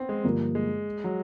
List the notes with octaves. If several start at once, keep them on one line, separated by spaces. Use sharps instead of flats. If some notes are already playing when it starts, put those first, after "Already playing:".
Already playing: B3 C4
G#3
G2 D3 F3 A#3
G#3
F#3